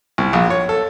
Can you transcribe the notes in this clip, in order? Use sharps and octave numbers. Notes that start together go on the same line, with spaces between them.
C2
A#1
C#5
A4